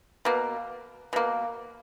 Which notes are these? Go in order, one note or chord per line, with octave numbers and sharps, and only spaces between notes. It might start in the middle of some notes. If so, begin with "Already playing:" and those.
B2 A#3
B2 A#3